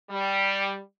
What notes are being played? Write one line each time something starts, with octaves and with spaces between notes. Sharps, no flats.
G3